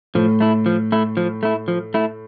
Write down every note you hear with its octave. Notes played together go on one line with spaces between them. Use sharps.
A2 F3
A3 E4
F3
A3 E4
F3
A3 E4
F3
A3 E4